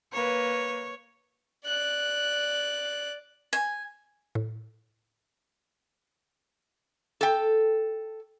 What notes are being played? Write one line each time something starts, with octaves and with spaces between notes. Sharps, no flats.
A#3 B4 C#5
D5 F#6
G#5
A2
A4 G5